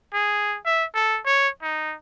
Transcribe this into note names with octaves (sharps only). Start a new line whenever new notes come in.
G#4
E5
A4
C#5
D#4